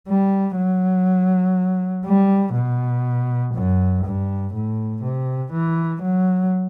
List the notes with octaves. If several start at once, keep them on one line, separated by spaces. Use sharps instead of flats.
G3
F#3
G3
B2
F#2
G2
A2
C3
E3
F#3